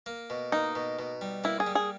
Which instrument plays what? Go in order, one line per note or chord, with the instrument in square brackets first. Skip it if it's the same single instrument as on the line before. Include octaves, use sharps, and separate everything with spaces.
[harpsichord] A#3
B2
[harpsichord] A#3 [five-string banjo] D#4
[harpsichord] B2
B2
G3
[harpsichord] A#3 [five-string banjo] E4
[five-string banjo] G#4
[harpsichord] G3
[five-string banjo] G#4